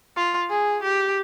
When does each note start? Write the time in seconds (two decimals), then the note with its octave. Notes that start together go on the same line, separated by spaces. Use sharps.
0.16 F4
0.50 G#4
0.83 G4